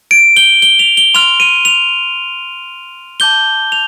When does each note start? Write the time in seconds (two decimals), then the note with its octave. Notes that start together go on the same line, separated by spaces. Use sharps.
0.11 D7
0.37 G7
0.62 G7
0.79 F7
0.97 G7
1.14 C6 F6 F7
1.40 D#7
1.65 F7
3.20 A5 D6 G6 G7
3.72 F7